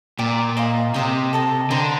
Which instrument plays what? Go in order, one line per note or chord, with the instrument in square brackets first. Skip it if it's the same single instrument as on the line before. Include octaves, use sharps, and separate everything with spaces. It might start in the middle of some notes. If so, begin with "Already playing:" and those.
[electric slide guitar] A#2 [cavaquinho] D5 G5 D6
[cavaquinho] F4 C5 D#5
[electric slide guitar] C3 [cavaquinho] C5 D#5 G5
[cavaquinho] A4 D#5 A5
[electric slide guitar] D3 [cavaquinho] C5 G5 A#5